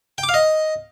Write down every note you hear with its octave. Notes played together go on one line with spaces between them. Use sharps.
G5
D6
F5
D#5